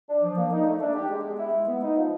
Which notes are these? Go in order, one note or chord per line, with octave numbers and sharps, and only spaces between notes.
D4
F3
A#3
D#4
A3
D4
G4
G#3
B3
E4
G#3
B3
D#4
F3